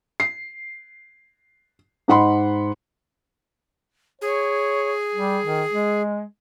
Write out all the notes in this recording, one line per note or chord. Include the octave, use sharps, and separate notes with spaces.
C7
G#2 D#4 F#5 B5 C6
G#4 C#5
G3
D#3
G#3